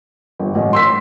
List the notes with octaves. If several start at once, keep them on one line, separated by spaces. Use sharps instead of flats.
G1
A1
C6 E6 B6